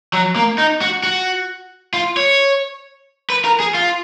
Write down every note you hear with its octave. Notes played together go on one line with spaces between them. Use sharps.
F#3
A#3
D#4
F#4
F#4
F4
C#5
B4
A#4
G#4
F4